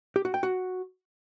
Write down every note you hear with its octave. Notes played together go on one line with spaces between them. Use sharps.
G4
F#4
G5
F#4